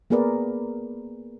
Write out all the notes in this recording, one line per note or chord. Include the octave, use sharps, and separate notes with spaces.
A#3 B3 G#4 A#4 B4 D5